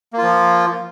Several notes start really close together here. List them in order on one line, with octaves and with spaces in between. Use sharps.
A#3 F4 F3